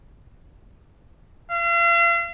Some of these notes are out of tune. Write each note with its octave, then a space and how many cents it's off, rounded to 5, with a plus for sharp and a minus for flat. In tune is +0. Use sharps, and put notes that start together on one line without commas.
F5 -40